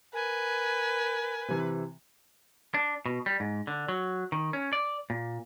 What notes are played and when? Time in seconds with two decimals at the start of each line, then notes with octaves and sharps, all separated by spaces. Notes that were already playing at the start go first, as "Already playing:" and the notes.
0.14 A#4 B4 G#5
1.48 C3 E3
2.74 D4
3.06 B2
3.26 G3
3.40 G#2
3.67 D3
3.89 F#3
4.32 D#3
4.53 C#4
4.73 D5
5.10 A#2